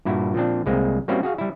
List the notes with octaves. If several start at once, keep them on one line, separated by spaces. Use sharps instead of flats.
G2 A#2 E4 F#4
A#2 F3 C4 D4
C2 G#3 A#3 C4
G3 A#3 C4 C#4 E4 F#4
F#4 G#4 F5
G3 E4